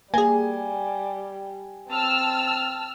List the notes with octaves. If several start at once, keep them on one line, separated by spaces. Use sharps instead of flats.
G3 A#3 G#4 G#5
C4 A5 E6 F6